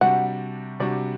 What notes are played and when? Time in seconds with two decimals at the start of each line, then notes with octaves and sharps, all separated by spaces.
0.01 C3 G3 D4 F#4 F#5
0.80 C3 G3 D4 F#4 D5